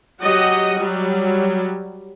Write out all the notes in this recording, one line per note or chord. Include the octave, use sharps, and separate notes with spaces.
F#3 G4 D#5 F#5
F#3 G3